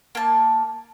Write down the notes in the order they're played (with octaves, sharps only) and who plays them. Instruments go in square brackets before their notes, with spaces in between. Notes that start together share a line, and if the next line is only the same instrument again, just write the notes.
[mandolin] A#3 A5